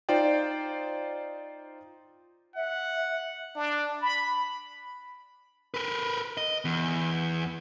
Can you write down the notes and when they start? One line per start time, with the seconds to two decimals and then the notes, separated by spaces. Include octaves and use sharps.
0.09 D#4 F4 C5 D5 G5
2.56 E5 F#5
3.56 D4
4.02 B5
5.74 A#4 B4
6.37 D#5
6.65 E2